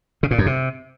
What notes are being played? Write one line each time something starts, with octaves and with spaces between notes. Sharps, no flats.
C#3
A#2
F#2
C3